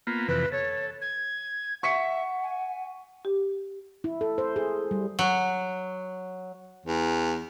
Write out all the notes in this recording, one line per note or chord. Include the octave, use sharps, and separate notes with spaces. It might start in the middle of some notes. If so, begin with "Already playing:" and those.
A#3 B3 F4
F2 C3 E3 B4
A4 C#5
G#6
E5 F#5 C#6 B6 C#7
G#5
G4
E4
A4
C5
G#4
G3
F#3
E2